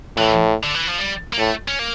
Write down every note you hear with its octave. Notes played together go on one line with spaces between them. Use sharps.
A2 E3
D3
E3
F3
G3
A#3
A2 A3
C#4
A#3